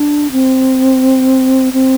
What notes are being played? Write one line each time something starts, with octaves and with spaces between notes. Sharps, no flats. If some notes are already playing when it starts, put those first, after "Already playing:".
Already playing: D4
C4
C4